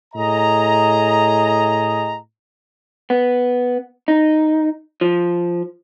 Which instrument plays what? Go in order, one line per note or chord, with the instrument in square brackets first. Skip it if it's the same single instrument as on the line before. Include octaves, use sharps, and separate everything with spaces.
[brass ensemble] A2 G#4 D#5 A#5
[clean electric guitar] B3
D#4
F3